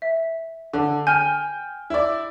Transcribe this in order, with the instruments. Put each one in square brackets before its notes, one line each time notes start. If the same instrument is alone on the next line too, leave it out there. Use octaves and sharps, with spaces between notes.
[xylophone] E5
[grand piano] D3
[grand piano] G5 F6 G6 [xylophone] G#5
[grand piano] E4 D5